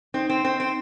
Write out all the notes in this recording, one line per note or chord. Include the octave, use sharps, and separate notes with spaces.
C4 D#4
C4
C4
C4